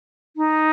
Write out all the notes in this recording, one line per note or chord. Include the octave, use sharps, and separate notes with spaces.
D#4